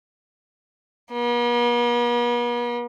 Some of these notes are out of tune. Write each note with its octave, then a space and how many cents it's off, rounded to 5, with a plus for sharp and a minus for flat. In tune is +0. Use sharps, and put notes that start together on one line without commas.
B3 -45